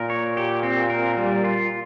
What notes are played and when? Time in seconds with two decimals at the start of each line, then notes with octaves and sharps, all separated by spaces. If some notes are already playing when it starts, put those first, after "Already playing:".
Already playing: A#2 A#4
0.10 C#5
0.37 G4
0.63 C4
0.90 A#4
1.17 G3
1.44 F4